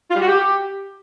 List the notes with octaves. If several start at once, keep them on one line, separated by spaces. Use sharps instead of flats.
F4
G3
F#4
G4